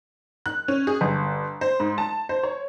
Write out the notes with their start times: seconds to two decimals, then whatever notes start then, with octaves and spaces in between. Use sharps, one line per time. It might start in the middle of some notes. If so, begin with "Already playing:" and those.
0.46 F#6
0.68 C#4
0.87 G#4
1.01 G1
1.61 C5
1.80 G#2
1.98 A5
2.29 C5
2.43 C#5